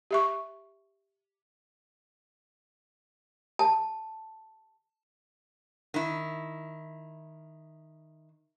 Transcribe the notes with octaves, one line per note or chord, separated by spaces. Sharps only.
G4 E5 C#6
A5
D#3 E4